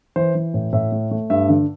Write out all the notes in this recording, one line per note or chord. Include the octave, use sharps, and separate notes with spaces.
E3 C5
E3
A2
A2 E5
A3
A3
G2 E5
D3